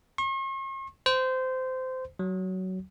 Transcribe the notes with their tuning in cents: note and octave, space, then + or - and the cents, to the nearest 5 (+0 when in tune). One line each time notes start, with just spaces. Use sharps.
C#6 -45
C5 -20
F#3 +15